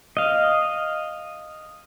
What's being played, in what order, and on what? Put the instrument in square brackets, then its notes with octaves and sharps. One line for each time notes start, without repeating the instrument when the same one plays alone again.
[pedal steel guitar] D#5 F5